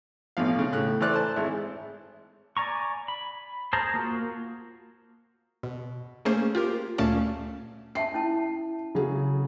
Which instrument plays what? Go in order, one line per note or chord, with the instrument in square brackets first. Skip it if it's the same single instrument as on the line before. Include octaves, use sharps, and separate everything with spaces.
[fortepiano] A1 B2 F3 F5
C#3
A2 F#6
E3 A3 C5 D5 F#6
C5 A5
G#1 G#3 E4
[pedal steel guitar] D5 G#5 A#5 C#6
B5
G#4 C5 A5 A#5
A#3 F4 F#4
[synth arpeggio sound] B2
A3 A#3 C#4 G#4 C5
F4 G4 A#4
D2 A#2 A3 C#4 F5 A5
[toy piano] C#4 E5 A5 [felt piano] C7
[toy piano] C#4 E4 A5
[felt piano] C#3 F#3 G#4